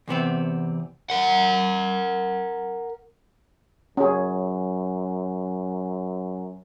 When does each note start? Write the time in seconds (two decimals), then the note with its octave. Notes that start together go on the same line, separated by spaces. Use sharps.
0.08 E2 C3 B3 C4
1.10 A#4 F#5
3.97 F#2 C#4 G#4